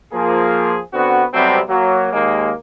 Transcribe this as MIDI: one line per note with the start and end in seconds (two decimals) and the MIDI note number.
0.13 0.78 53
0.13 0.78 58
0.13 0.78 68
0.94 1.24 50
0.94 1.24 59
0.94 1.24 60
0.94 1.24 66
1.34 1.60 48
1.34 1.60 54
1.34 1.60 55
1.34 1.60 57
1.34 1.60 59
1.34 1.60 60
1.69 2.09 54
1.69 2.09 58
2.13 2.52 39
2.13 2.52 56
2.13 2.52 58